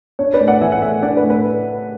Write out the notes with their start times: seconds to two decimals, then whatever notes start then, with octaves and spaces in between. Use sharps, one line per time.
0.19 D4 C#5
0.34 B4 D5
0.40 A2
0.47 D5 F#5
0.61 E3 E5 G#5
0.72 F#5
0.82 A3 E5 G#5
1.02 D4 D5 F#5
1.16 B4 D5
1.24 A2
1.30 B4